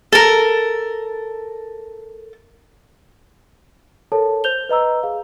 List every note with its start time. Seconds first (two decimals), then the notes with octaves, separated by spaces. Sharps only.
0.12 A4 A#4
4.12 A4 A#4 C#5 A5
4.44 C5 G6 F7 G7
4.69 B4 D#5 A#5 E6
5.03 G#4 F5